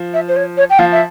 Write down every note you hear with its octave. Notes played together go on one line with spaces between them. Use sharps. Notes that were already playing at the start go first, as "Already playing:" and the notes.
Already playing: F3
E5
C5
C#5
C#5
G5
F3 F5
E5